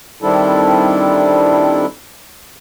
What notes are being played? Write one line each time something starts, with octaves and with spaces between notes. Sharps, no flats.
D#3 G3 C4 D4 E4 A4